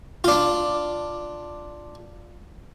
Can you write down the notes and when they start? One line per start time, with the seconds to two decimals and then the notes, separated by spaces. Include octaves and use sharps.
0.24 D4 F4